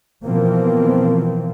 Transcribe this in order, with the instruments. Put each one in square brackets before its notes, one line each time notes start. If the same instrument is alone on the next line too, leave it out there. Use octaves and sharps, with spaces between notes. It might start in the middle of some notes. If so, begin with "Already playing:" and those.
[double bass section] B2 E3 F3 A#3 C4